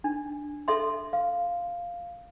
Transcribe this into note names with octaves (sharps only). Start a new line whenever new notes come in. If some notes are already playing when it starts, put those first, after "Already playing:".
D4
A4 E5 C6
F5